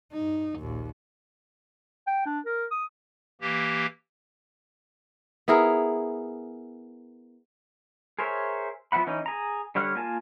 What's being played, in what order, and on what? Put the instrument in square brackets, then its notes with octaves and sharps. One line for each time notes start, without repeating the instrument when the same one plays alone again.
[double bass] G2 D#4
A#1 D#2
[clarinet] G5
D4
A#4
D#6
[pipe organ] E3 A#3 G4
[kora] B3 E4 G#4 A#4
[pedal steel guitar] G#4 A#4 C5 C#5 E5
F3 B3 E4 F#5 B5
E3 C#4 D#4
G#4 A#5
D3 G3 C#5 F#5 F6
A#3 F4 A#4 G#5 A5